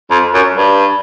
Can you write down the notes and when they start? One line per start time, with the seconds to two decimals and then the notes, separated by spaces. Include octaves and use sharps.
0.11 F2
0.34 F#2
0.58 G2